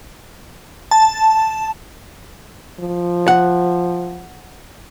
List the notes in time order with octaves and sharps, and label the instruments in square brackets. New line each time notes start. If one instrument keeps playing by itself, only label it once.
[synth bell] A5
[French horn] F3
[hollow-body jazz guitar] F#5